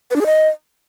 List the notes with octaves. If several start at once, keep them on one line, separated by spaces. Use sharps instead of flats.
B4
D4
G#4
D#5